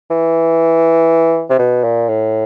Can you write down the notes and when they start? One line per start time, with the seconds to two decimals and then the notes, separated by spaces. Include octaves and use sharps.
0.10 E3
1.50 C3
1.59 B2
1.83 A#2
2.09 A2